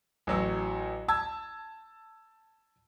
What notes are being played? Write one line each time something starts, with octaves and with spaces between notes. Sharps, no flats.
A1 F#3 E6
A5 E6 G#6